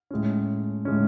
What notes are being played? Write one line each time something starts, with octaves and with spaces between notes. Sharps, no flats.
A2 G#3 C#4
A2 G#3 C#4